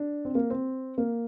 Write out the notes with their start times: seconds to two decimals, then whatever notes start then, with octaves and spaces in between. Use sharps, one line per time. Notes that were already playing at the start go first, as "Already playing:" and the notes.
Already playing: D4
0.25 C4
0.35 A#3
0.50 C4
0.98 A#3